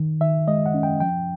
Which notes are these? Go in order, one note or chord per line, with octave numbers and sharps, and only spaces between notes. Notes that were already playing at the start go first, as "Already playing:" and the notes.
Already playing: D#3
D#3 E5
G#3 D#5
F#5
C#4
G5
F3 G5